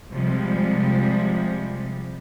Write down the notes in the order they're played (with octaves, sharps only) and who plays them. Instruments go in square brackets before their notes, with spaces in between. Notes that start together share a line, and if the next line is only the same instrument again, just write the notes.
[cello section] C3 F3 G3 G#3